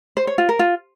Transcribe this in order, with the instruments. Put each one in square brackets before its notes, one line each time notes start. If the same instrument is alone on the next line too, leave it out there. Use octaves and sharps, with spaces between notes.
[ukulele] C5
C#5
F4
A#4
F4